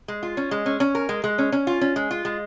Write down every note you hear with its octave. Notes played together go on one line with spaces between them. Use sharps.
G#3
F4
C#4
G#3
C#4
C#4
A#4
G#3
G#3
C#4
C#4
F4
C#4
G#3
F4
G#3